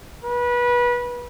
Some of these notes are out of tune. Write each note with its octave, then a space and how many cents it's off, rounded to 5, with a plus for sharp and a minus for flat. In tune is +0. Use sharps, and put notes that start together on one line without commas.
B4 -25